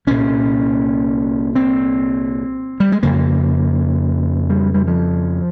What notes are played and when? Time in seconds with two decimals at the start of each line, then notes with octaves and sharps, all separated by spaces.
0.07 C2 A#2 C#4
1.55 C4
2.80 G3
2.92 G#3
3.03 F2 C#3 A#3
4.50 G3
4.74 G3
4.87 F3